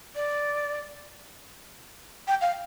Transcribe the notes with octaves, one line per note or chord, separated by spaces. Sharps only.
D5
G5
F5